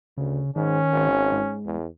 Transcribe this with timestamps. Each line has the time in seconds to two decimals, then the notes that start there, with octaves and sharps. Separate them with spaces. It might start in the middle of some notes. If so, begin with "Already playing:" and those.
0.17 D2 C#3
0.56 G#2 D#3 C#4
0.92 G#1
1.32 G#2
1.66 E2